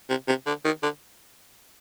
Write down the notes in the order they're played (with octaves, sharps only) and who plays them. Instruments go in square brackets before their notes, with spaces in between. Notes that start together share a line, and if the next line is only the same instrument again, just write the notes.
[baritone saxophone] C3
C3
D3
D#3
D3